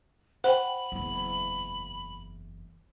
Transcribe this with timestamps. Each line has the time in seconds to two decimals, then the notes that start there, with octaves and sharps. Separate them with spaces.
0.44 C5 F#5 G5 B5
0.92 F#1 E2